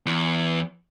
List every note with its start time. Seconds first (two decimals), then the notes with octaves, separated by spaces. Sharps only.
0.06 E2